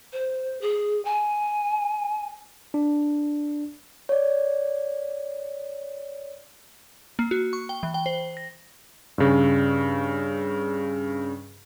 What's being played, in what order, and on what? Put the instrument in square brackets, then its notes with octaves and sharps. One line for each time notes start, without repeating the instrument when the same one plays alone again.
[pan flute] C5
G#4
G#5
[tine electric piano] D4
[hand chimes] C#5 D5
[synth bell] A#3
F#4
C#6
G5
E3
G5
C5
A#6
[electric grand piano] G2 C#3